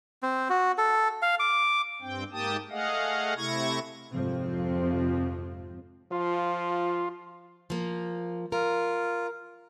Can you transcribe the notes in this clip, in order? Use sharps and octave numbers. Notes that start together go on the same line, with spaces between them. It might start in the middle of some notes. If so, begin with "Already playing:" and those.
C4
F#4
A4
F5
D6
G2 C4 G5
G#2 A#3 G4 G5 A5 D#6
A3 G#4 D#5 F5 F#5
C3 A3 E4 C#6 G#6 A#6
G#1 F2 C3 F3 C4
F3 F4
F3 A#3
F4 A#4